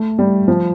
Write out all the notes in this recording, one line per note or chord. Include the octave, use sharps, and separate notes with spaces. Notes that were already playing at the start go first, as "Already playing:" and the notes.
Already playing: A3
G3
F3